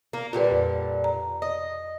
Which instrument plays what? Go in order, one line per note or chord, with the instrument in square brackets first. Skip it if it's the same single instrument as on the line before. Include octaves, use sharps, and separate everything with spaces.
[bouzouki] A#3
[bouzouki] A#2 D3 G3 [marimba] F4 G4 B4
[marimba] F2
A#5
[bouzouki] D#5